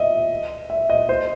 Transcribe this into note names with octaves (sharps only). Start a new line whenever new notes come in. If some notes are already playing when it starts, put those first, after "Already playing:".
Already playing: D#5 E5
E5
D#5
C5